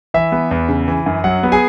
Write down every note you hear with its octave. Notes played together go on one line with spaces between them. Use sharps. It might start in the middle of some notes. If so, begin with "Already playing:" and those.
E3 E5
B3
E2
C#3
E3
F#2
F#3 F#5
B3
G#4 G#5